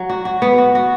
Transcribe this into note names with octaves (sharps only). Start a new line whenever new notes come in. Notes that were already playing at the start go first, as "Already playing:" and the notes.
Already playing: F#3
F#4
F#4
B3
F#4
F#4